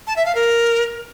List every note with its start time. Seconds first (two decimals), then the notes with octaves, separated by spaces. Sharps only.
0.07 A5
0.16 E5
0.26 F5
0.35 A#4